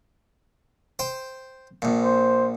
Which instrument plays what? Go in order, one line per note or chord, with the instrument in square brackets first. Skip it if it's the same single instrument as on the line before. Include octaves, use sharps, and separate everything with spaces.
[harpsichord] C5 G5
A#1 A#2
[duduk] C5